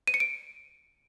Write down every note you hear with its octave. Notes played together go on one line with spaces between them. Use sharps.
D#7
C#7
D7